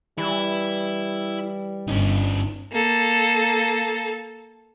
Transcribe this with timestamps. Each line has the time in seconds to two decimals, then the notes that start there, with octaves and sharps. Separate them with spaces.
0.18 E3 G3 E4
1.88 G1 C#4 D#4
2.72 A#3 A4